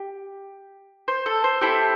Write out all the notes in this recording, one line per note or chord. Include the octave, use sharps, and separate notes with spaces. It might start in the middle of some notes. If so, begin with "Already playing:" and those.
Already playing: G4
C5
A4
C5
C4 E4 G4 A4